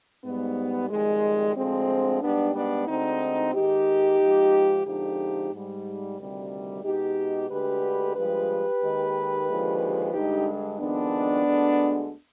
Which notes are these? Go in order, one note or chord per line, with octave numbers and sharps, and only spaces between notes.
G#2 G3 B3
F2 D#3 G3 G#3
D2 D3 F3 G#3 C4
G#2 G3 B3 D4
B3 D4
D2 D3 G#3 C4 D#4
G#2 D#3 G#3 D#4 G4
G#2 F3 G#3
F2 D3 F3 G#3 D#4 G4
G#2 G3
D2 C3 D#3 G3
B2 G#3 D#4 G4
D2 D3 G#3 G4 B4
G2 F3 G#3 G4 B4
D#2 D#3 G#3
D#2 D3 F3 G#3
G2 D3 G#3 D#4 G4
F2 D#3 G#3 B3 D4
D2 D3 G#3